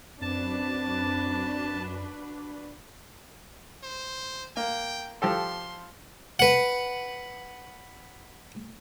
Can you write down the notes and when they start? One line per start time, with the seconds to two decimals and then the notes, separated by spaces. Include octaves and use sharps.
0.22 F#2 C4 D4 F#4 B4 A5
3.83 C5
4.57 A#3 G5
5.22 F3 G4 A4 C6
6.39 B4 F#5